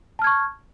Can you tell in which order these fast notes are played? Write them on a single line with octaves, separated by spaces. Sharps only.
A5 F6 G#6 C#6